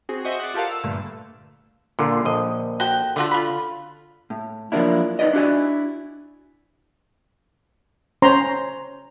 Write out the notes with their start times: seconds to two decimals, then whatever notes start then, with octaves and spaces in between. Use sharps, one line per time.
0.09 C4 F#4 G#4
0.25 F#4 C5 D#5 E5
0.39 D5 F#5
0.54 F4 G4 A4 A#4 F5
0.69 E6
0.84 G2 A#2 D3 A3
1.99 A#2 D3 F4
2.25 A#1 D#5
2.80 F#4 A4 G5
3.16 D3 A3 F4 F#4
3.31 F4 B5
4.30 A2
4.72 F3 F#3 A#3 D4 E4
5.19 D#4 B4 D5 D#5
5.33 D4 E4 F#4 D5 G#5
8.22 C#4 C5 C#5 A#5 C6